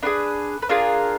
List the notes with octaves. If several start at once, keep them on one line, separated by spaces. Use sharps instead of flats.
D4 F4 G#4 B4
B4
D4 F4 G#4 A#4